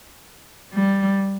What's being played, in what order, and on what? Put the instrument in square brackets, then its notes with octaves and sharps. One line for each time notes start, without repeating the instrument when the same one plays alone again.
[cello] G3